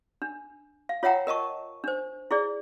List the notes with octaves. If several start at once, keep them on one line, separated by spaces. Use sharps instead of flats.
D4
F5
F4 C#5 E5 F#5 G5 A#5
A#4 D#5 A5 C#6
D4 C5
E4 G#4 D5